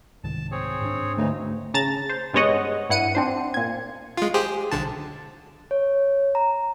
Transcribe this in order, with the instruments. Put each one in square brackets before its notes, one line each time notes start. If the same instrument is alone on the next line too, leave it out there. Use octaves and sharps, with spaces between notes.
[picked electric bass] C2 G#2 D#3 [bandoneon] A5
[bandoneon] C4 G#4 C#5
[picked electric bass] G#2 D4
[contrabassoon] D2 [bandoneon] C#3 E3 D#4
[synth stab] C#3 A5 A#5 A6
C5
G2 G#3 B3 C#5 D#5 F#5
G2 E4 F#5 C#7 D#7
C4 D4 C5
A#2 G#6
[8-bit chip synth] G#3 F4
G4 G#4 C5
B1 D3 A5
[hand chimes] C#5
A#5